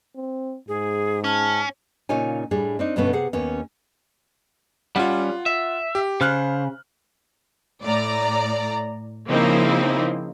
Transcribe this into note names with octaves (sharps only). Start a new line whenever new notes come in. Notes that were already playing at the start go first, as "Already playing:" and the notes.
C4
G#2 G#4
C#4 G#4 A5 F6
A#2 C#3 D#4 F4 C#5 G#5
A2 G3 D4 G#4
C4 D4 D#4
G2 B2 D3 A3 B3 C#4
C3 G#4 F#5
D#2 B3 C#4
G3 C#4 F4 F#5
E5
G4
C#3 C5 F6 F#6
A2 D5 A#5
C#3 F3 A#3 C4 D#4 E4